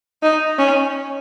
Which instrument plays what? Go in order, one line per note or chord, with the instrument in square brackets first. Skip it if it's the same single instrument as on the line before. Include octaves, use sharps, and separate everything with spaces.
[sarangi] D#4
C#4